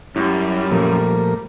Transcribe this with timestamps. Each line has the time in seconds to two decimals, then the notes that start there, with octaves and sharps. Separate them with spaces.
0.16 F#2 G3 E4
0.71 A#2 F3 A3 A#4